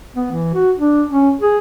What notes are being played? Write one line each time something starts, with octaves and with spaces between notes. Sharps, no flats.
B3
E3
F#4
D4
C#4
G#4